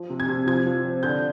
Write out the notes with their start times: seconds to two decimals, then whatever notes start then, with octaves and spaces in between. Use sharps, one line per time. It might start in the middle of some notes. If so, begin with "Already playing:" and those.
Already playing: F3
0.10 C3
0.20 G#6
0.28 C3
0.46 F3 G#6
0.66 F3
0.85 C4
1.03 D3 G6